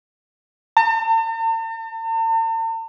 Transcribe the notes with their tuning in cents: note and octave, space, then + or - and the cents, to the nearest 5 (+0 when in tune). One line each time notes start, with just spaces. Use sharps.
A5 +45